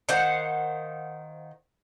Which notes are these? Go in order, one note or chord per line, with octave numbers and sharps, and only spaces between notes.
D#3 C5 F5 F#5